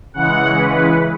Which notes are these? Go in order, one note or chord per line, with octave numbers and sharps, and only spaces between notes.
C#3 E3 G#3 F#5
B4